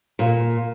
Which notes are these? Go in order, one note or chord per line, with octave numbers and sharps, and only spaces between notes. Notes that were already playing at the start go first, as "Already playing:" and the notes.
A#2